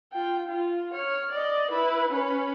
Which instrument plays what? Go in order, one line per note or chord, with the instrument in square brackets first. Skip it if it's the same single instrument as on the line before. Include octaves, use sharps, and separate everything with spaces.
[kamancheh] F4 G5
F4
C#5 F6
D5 D#5
E4 B4
C#4 B4